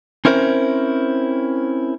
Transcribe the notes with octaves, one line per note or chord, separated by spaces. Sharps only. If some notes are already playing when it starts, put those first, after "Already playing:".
C4 C#4 E4 A#4 C5